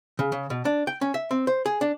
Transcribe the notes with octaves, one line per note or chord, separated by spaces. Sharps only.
C#3
C#3
B2
D4
G5
C#4
E5
C4
C5
G#4
D4